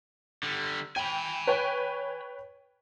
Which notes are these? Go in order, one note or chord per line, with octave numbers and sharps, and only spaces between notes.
D3 G3
G5 G#5 B5
B4 C#5 G5